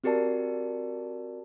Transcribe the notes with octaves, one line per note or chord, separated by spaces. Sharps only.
C4 F#4 G4 A#4 D5 A5